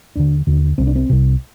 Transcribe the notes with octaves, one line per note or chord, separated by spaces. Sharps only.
D#2 D3 D4
D#2 D3
C2 C3 C4
D4
C4
C2 C3